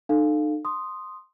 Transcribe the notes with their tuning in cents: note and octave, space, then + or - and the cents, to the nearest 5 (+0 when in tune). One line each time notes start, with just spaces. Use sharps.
D#4 -45 A4 +0 F5 +0
C6 +0 D#6 -5